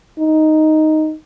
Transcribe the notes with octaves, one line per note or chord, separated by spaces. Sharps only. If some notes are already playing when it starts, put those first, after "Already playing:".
D#4